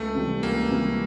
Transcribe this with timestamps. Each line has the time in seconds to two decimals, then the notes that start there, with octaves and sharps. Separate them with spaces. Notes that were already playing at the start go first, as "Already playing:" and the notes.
Already playing: C#2 A3
0.15 C3 E3 G3
0.43 C#2 A#3
0.71 C3 E3 G3